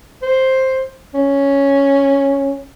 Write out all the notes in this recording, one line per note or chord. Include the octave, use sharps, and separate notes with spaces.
C5
C#4